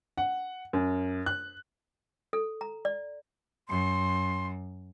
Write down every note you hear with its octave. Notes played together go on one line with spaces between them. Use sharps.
F#5
F#2
F#6
A4
A#5
D5
F#2 C6